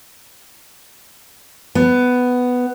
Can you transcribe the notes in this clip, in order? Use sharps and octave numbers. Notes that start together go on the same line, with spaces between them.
B3